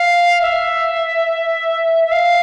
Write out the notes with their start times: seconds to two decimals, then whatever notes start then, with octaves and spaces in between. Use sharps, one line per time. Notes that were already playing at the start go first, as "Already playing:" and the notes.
Already playing: F5
0.41 E5
2.06 E5
2.11 F5